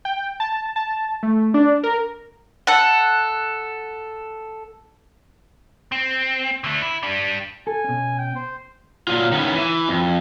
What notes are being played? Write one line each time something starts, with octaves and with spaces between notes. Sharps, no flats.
G5
A5
A5
A3
D4
A#4
A4 F#5
C4
D3 A3
E4
G3 D4
A4 G#5
B2 C#4
G5
C5
A#2 D#3 F#3 F4
D#3 B3 C#4 E4
E3
F2